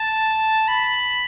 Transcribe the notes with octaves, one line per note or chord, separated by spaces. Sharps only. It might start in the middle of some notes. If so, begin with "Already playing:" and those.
Already playing: A5
B5